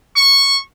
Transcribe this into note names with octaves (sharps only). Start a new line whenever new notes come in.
C#6